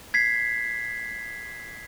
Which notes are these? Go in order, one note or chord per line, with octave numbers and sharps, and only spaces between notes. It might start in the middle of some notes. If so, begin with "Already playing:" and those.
G#6 B6 C7